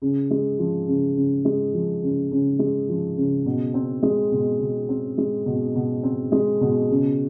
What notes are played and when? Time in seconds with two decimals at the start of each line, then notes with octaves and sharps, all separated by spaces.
0.02 C#3
0.31 G#3
0.59 F3
0.88 C#3
1.16 C#3
1.45 G#3
1.74 F3
2.03 C#3
2.31 C#3
2.59 G#3
2.88 F3
3.17 C#3
3.46 B2
3.74 C4
4.03 G#3
4.32 B2
4.60 B2
4.89 C4
5.18 G#3
5.46 B2
5.75 B2
6.03 C4
6.32 G#3
6.61 B2
6.90 C#3